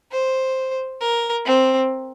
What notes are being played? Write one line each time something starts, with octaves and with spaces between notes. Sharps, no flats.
C5
A#4
C4